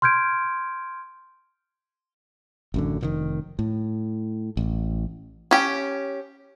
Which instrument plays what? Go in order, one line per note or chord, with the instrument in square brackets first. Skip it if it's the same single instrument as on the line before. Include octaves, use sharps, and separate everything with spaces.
[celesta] C6 F6 G6 G#6 D7
[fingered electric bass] A1 F#2 D3
F1 A#2 D#3
A2
A1
[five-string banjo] C#4 G4